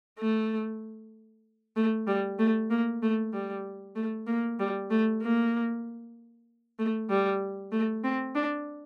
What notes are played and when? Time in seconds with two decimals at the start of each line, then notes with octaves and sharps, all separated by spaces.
0.19 A3
1.76 A3
2.07 G3
2.39 A3
2.70 A#3
3.02 A3
3.33 G3
3.96 A3
4.27 A#3
4.60 G3
4.91 A3
5.22 A#3
6.79 A3
7.09 G3
7.72 A3
8.04 C4
8.35 D4